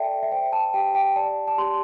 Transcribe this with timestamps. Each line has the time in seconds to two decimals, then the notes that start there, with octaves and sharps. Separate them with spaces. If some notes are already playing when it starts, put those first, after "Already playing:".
Already playing: A4 D5 E5 G5 A5
0.23 E5
0.32 C5 G5
0.52 A5
0.74 G4 G5
0.95 G5
1.16 D5 A5
1.48 A5
1.58 G4 C6